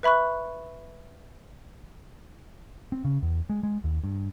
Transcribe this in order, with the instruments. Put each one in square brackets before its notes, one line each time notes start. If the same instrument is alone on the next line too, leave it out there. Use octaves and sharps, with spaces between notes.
[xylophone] B4 E5 B5 C#6 F#6
[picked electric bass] C4
C#3
E2
G#3
G#3
D#2
G2